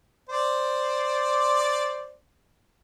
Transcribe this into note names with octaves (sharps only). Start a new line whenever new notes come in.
C5 D5